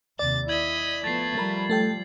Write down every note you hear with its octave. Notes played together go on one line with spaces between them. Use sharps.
D#2 C3 D5 A6
E4 D#5 G#6 B6 F#7
F3 A3 B3 A6 C7
F3 G3 A#4 B5
A3 A4 G5